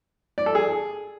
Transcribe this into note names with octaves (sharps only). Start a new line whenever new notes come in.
D5
A4
G#4